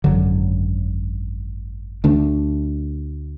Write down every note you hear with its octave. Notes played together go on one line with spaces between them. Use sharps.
G#1 F#2 D3 F#3
D2 D3 A3 D4